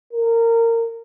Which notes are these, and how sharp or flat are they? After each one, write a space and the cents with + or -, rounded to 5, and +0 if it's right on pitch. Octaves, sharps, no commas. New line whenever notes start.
A#4 -20